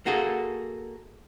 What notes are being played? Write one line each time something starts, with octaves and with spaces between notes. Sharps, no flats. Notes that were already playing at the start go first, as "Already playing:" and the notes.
A#3 F#4 G#4 A4